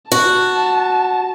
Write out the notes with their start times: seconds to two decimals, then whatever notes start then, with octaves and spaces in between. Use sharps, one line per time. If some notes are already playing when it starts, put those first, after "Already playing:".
0.12 F#4 A5